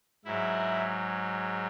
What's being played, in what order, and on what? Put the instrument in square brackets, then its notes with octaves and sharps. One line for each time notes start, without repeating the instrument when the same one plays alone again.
[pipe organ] G#2 F#3 E4